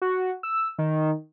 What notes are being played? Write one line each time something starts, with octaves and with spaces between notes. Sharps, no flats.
F#4
E6
D#3